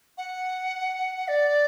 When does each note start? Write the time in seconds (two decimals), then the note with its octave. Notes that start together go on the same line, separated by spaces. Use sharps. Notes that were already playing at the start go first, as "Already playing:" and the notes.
0.18 F#5
1.28 D5